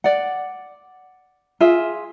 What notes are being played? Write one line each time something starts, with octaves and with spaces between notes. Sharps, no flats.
D5 F#5
F4 G#4 E5